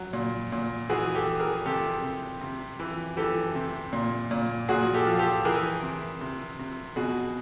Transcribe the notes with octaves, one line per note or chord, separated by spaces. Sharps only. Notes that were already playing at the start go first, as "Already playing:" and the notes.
Already playing: F#3
A#2
A#2
E3 F#4 G#4
G4 A4
E3
G#4 A#4
C3 G4 A4
C3
C3
E3
E3 G4 A4
C3
A#2
A#2
A#2 F#4 G#4
G4 A4
F3
G4 A4
E3 G#4 A#4
C3
C3
C3
B2 F#4 G#4